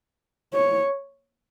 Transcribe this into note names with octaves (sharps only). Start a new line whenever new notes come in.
C#5